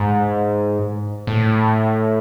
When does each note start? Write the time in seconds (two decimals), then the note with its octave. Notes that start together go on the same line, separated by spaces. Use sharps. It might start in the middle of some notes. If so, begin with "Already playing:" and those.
Already playing: G#2
1.27 A2